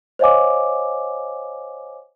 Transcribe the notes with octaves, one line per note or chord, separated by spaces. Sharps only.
C5 C#5 D#5 F5 G#5 D6